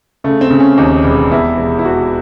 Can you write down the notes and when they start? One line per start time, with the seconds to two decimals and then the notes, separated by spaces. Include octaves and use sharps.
0.24 C#3 A3
0.41 C4
0.50 C#3
0.60 C#4
0.78 D#2 D#4
1.04 E1
1.31 E2 E4
1.57 E1
1.79 E4
1.85 E1 F#4